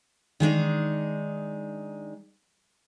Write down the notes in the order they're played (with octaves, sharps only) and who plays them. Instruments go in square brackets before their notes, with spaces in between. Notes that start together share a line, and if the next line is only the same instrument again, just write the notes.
[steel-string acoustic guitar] D#3 G#3 D4 D#4